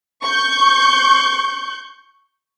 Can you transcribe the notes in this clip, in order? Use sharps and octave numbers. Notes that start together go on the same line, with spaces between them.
C#6 G6